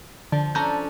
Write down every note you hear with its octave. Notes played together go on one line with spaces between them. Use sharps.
D3 F3
C#4 D4 A4 A#5 G6